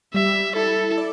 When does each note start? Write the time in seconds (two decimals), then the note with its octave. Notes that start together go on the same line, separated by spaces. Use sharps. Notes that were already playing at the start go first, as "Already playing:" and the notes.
0.14 G3 E5
0.56 E4 A4
0.97 D5